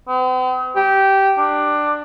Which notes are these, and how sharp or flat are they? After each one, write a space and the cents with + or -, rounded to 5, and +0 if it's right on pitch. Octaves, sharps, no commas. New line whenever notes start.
C4 -45
G4 -15
D4 +15